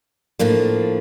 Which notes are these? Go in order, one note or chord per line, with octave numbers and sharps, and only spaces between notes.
A2 F3 A#3 D4